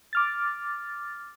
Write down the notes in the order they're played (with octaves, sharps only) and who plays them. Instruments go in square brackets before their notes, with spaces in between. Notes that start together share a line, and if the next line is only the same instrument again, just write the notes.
[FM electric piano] D6 F6 A6